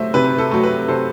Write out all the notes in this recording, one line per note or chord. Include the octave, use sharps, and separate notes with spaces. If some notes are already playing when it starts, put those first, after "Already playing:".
Already playing: C3 F#3 A3 C5 E5
C3 B4
A4
F#3 A3
B4
C3 A4 C5